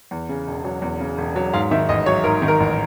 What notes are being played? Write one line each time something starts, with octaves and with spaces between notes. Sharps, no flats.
E2
C#3
E1
F#3
E2
C#3
E1
F#3
G#2 F5
D#3 E5
A1 D#5
F#3 C#5
G#2 A#4
D#3
A#4
A1